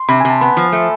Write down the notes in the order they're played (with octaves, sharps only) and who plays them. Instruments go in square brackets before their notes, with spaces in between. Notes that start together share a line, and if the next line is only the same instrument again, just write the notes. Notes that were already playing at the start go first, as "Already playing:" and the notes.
Already playing: [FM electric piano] C6
[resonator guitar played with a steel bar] C3 [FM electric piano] B5
[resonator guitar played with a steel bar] C3 [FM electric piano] G#5
[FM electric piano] A5
[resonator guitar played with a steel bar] B3 [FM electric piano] B5
[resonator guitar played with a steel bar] F3
A3